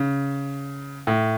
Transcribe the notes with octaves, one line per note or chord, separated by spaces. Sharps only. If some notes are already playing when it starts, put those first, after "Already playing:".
Already playing: C#3
A2